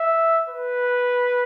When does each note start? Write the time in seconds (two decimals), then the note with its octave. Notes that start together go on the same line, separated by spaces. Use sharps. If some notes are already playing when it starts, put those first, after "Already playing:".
Already playing: E5
0.49 B4